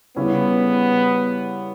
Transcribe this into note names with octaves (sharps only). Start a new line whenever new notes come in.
C#3 G3 B3 C#4 E4